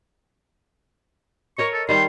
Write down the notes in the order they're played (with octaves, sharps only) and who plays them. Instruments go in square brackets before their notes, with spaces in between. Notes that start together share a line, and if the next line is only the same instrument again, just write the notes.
[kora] A#4 C#5 D#5 [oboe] C#6
[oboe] A4
[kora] D#3 G3 [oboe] C6